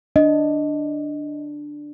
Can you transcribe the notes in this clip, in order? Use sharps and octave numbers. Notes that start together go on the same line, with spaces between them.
D4 D#5